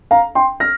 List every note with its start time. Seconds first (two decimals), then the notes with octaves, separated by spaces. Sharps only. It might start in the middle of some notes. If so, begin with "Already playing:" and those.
0.11 F5 A#5
0.35 G5 C6
0.60 F6 A#6